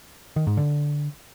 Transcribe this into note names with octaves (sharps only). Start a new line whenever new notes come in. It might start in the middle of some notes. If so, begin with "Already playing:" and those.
D#3
G#2
D3